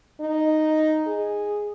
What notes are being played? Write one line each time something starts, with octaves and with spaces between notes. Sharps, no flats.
D#4
G#4